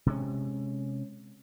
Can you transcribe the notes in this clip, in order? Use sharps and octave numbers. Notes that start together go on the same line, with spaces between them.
C3 G#3 C#4